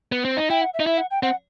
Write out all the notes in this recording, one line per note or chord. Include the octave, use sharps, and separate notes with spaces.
B3
C4
D#4
E4 G5
F#5
E5
D#4
E4 E5
F#5
G5
C4 F#5